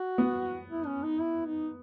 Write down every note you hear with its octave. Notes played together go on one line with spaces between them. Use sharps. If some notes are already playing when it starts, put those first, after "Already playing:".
Already playing: F#4
B3
E4
C#4
D#4
E4
D#4